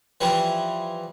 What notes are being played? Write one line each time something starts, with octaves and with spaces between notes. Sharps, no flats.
E3 F3 G3